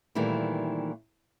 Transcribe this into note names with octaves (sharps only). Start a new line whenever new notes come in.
A#2 D#3 E3 G3 A3 C4